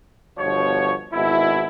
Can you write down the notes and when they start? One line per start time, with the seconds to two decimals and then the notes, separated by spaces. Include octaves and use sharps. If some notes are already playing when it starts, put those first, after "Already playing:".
0.38 G1 B2 F3 C#5
1.13 G#1 B2 E4